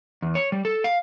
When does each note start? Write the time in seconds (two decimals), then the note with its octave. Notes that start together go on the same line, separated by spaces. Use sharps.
0.22 E2
0.35 C#5
0.52 G3
0.65 A4
0.84 F5